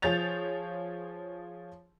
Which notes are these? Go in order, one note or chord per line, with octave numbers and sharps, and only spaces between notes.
F3 G#4 C#5 G6 A6 F7